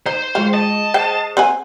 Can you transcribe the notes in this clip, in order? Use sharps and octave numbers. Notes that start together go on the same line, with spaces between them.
D#4 C5
G#3 F4 G#4 G5
D#5 A5
G#4 C5 G5 C7
C4 F#5 G#5